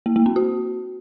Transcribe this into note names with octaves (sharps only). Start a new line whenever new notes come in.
A#3
A#3
C4
F#4